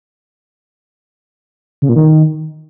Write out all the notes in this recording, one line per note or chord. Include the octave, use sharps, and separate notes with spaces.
C#3
A#2
D#3